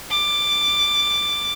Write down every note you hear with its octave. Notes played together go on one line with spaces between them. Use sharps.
D6